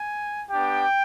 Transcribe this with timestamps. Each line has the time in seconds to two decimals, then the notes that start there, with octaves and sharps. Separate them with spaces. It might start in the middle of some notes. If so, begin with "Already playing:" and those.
Already playing: G#5
0.51 B3 D4 G4 G5